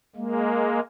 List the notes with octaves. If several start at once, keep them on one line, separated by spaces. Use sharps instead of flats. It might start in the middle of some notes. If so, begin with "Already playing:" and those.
G#3 A#3